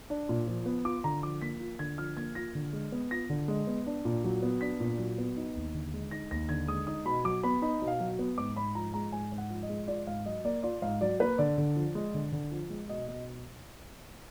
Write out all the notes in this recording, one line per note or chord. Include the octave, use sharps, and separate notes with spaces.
D4
A#2
F3
B3
F4 D6
D3 A#5
F3 D6
A#3 B6
F4
D3 G#6
F3 F6
A#3 G#6
F4 A#6
D3
G#3
B3
F4 A#6
D3
G#3
B3
D4
A#2
F#3
B3
D4 B6
A#2
F#3
B3
D#4
D#2
D3
G#3
D#4 A#6
D#2 A#6
D3 G#6
G#3 D#6
D#4 D#6
B2 B5
F#3 D6
B3 B5
D#4 B5
B2
F5
F#3
B3
G#2 D6
G#2 B5
F3 A#5
G#3 A#5
G#2 G#5
G#2
F#5
F3
D#5
G#3
F4 D5
G#2 F5
F#3 D#5
A#3 D5
F4 D5
G#2 F5
F#3 D5
A#3 B4
D3 D5
D3
F3
G#3
D3
D3
F3
G#3
B2 D#5
B2 D#5